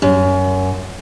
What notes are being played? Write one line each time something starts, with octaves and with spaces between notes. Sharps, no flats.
F#2